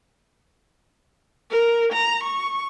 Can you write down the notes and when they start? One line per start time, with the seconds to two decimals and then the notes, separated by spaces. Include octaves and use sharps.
1.51 A#4
1.93 A#5
2.24 C#6